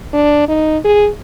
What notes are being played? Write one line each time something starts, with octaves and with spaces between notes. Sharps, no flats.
D4
D#4
G#4